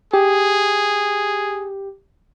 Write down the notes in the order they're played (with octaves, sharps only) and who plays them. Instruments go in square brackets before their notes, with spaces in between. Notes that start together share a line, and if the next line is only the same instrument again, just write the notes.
[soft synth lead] G4 [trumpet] G#4